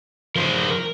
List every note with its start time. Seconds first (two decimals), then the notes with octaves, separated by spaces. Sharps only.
0.36 F3 D#4 A#4 C5
0.70 A#4